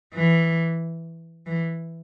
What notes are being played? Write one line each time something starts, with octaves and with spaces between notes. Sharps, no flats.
E3
E3